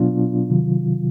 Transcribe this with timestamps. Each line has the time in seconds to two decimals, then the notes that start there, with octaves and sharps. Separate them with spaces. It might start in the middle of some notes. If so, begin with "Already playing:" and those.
Already playing: B2 F#3 B3 D4 F4
0.50 C3 D#3 F#3